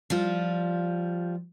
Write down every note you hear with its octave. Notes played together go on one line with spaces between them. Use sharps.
F3 G3 F4